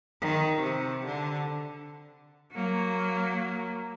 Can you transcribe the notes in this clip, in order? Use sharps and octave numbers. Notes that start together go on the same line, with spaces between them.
D#3
C3
D3
F#3 A#3